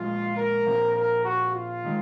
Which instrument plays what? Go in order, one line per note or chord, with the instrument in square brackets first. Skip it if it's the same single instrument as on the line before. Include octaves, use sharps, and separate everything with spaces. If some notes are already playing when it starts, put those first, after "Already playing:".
Already playing: [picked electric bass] A#2 F3 G#3 [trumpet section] F4
[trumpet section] A#4
[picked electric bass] A#2 F3 C4
[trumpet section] A#4
F#4
F4
[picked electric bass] D#3 G#3